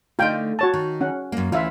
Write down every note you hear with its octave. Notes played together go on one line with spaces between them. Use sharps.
D3 A3 D#4 F4 G5
F#4 C#5 A5
D#3
C#4 F#5
F#2 A#3
D2 E3 C#4 F4 E5